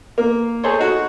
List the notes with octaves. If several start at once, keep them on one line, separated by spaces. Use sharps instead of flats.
A#3
G#4 A4 C5 C#5
D#4 F#4